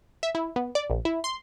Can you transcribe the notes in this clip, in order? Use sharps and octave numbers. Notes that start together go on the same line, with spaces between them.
E5
E4
B3
D5
A#1
E4
C6